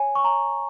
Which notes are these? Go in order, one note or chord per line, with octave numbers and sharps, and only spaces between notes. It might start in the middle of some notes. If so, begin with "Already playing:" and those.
Already playing: C#5 G#5
C#6
C#5 A#5